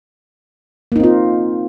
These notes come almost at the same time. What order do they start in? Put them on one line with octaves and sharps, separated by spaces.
A#3 D#4 C4 F4